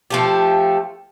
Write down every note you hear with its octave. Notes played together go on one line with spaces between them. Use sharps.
F3 A3 G4